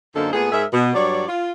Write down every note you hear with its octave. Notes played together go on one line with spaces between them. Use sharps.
F#2 D3 A#3 D#4 A4 C5
A#2 A3 B3 G#4
G#2 G#4 A#4 E5
B2
G2 F#3 C#5 D5
F4